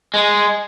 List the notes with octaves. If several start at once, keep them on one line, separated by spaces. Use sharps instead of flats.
G#3